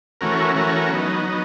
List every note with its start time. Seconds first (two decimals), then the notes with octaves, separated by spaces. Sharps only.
0.21 E3 A3 C#4 F#4 A#4
0.56 E3 A3 C#4 F#4 A#4
0.90 F#3 B3 D#4
1.25 F#3 B3 D#4